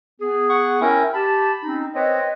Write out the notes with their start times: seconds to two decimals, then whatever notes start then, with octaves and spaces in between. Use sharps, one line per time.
0.21 B3 G#4
0.49 F#5 C#6
0.81 C#4 E4 A#4 G5
1.13 G4 A5 B5
1.63 C4 C#4 D#4
1.95 C4 B4 C#5 D#5